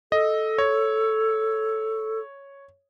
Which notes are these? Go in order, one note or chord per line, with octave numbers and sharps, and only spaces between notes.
A4 D#5
C#5